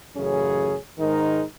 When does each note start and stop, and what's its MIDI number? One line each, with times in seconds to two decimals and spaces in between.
0.17 0.77 33
0.17 0.77 42
0.17 0.77 49
0.17 0.77 61
0.17 0.77 68
0.99 1.43 44
0.99 1.43 51
0.99 1.43 56
0.99 1.43 63
0.99 1.43 70